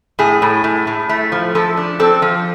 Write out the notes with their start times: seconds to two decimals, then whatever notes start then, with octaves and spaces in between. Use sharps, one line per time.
0.19 A2 G#4
0.42 A2
0.64 A2
0.87 A2
1.09 A3
1.32 F3
1.55 F3 A4
1.77 D4
2.00 C4 A4
2.22 F3